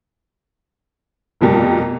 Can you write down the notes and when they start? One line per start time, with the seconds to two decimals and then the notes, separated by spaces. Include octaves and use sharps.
1.41 F1 F2 B2 G3 A#4